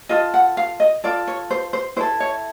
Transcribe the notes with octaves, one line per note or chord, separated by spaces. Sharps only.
F4 A4 D#5
F#5
F5
D#5
F4 A4 D5
C#5
C5
C5
E4 A4 C5
C#5